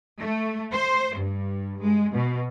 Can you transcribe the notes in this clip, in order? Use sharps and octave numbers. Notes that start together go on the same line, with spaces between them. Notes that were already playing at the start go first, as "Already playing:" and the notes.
A3
C5
G2
G#3
B2